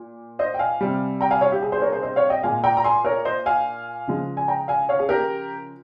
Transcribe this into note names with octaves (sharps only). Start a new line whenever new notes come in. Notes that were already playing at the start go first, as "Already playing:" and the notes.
Already playing: A#2
C5 D#5
G5
F5 G#5
C3 G3
G5 A#5
F5 G#5
C#5 F5
G4
G#4
G#4 C5
A#4 C#5
G#4 C5
C5 D#5
C#5 F5
D#5 G5
A#2 G#3 F5 G#5
G5 A#5
A#5
G#5 C6
A#4 C#5
C5 D#5
F5 G#5
C#3 F3 G#3
G#5
G5 A#5
F5 G#5
C#5 F5
G#4
G4 A#4